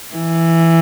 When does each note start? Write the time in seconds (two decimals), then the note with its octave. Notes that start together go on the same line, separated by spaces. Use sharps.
0.15 E3